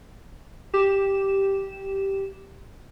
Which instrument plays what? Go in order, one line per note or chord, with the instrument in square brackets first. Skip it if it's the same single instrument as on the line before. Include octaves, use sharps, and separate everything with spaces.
[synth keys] G4 E7